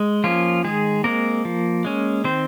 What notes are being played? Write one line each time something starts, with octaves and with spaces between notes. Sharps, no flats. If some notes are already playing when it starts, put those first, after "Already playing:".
Already playing: G#3
F3 A#3 C#4 F4
D#3 G#3 G#4
G#3 A#3 C4 A#4
F3
G#3 C#4
D#3 C4 C5